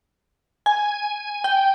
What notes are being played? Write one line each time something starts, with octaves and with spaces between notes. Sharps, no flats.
G#5
G5